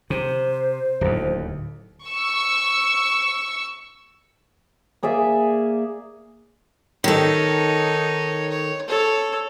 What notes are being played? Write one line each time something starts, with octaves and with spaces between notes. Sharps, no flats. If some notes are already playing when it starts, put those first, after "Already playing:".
C3 C5
D1 D#2
C#6 E6
A#3 G#4 D5 E5
D#3 D#4 A4 C#5
C#5
A4 C#5